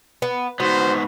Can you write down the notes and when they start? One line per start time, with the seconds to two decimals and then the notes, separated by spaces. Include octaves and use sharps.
0.22 B3
0.60 G#2 B3 F#4 C5